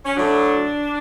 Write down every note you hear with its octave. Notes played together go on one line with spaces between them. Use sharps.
C#4
A2 F#3 A3 D4